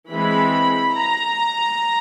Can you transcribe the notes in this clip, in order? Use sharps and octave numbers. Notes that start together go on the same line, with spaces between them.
E3 G#3 C4 B5
A#5